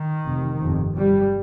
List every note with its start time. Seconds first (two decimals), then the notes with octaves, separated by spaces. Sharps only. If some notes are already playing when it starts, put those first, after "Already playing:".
Already playing: D#3
0.26 F1 F2 C3
0.60 G1 F2 C3
0.95 G1 G2 G3